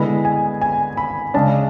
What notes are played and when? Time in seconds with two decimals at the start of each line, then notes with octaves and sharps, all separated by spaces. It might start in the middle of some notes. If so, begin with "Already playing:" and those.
Already playing: D3 G#3 B3 E4 B5
0.25 G#5
0.61 G#5
0.97 B5
1.34 C#3 G#3 D4 A5